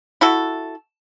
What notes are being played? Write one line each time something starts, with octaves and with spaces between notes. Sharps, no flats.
E4 F#4 A4